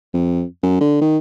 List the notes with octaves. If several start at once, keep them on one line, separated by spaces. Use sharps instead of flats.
F2
F#2
D3
D#3